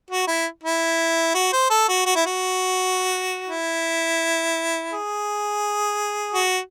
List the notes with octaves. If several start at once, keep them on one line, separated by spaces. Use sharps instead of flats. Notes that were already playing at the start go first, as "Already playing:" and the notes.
F#4
E4
E4
F#4
C5
A4
F#4
F#4
E4
F#4
E4
G#4
F#4